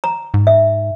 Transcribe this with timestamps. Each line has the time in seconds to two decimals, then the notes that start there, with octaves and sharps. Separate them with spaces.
0.04 A#5
0.34 G#2
0.47 E5